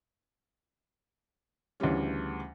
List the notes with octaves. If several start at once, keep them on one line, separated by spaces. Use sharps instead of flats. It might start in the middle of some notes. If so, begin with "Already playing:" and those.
D2 C#3 E3 G3 C#4